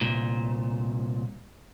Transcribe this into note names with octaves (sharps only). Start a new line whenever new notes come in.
C2 A#2